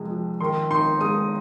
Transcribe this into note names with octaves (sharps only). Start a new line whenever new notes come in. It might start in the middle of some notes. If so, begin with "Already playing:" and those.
Already playing: F2 C3 F3 G#3
F3
D#3 C6
D#4 C6
G#3 D#6